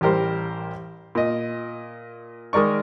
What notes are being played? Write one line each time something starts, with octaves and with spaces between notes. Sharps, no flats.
A1 G3 G4 A#4 C5
A#2 D#5
D#3 G#3 A#4 D5 C#6